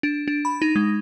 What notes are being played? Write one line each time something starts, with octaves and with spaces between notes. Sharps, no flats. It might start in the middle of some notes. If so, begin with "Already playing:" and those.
D4
D4
B5
D#4
G#3